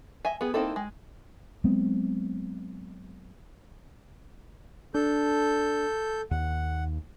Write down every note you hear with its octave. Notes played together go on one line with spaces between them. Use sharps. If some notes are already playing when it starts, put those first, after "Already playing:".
D#5 E5 G#5
B3 G#4
A#3 C4 D#4 E4 A4
G#3
F#3 G#3 B3 C4
D4 A4 G6
D#2 F#5